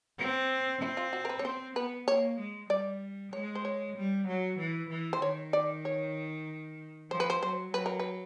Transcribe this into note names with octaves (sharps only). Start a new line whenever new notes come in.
C4
C4 E4
F4
F#4
A#4
B4
C#5
C4 C5
B3 B4
A#3 C#5
G#3
G3 D5
G#3 C#5
C5
C#5
G3
F#3
E3
E3
C5
D#3 C#5
D5
C#5
F3 C5
B4
C5
F#3 C5
F#3 B4
A#4
B4